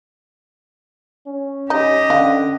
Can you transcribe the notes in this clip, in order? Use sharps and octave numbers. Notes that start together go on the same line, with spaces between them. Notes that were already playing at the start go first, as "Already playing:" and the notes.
C#4
D#4 G4 D#5
D3 C#4 F5